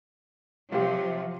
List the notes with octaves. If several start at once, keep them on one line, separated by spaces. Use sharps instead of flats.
C3 F3 F#3 F4 G4